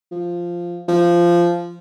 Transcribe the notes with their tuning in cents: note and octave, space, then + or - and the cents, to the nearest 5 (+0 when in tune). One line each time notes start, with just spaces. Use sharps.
F3 -5
F3 -15